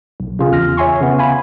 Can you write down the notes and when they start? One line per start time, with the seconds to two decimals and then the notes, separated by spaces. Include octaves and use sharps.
0.20 B1
0.39 C#3 F4 G#4
0.52 E2 F6 A#6
0.77 C#5 E5 G#5 C6 C#6
1.01 C#3 B3
1.19 F5 G#5 B5